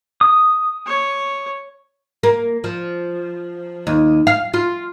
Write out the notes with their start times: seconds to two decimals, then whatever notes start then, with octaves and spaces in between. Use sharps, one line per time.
0.21 D#6
0.86 C#5
2.23 A#3
2.64 F3
3.87 D#2
4.27 F5
4.54 F4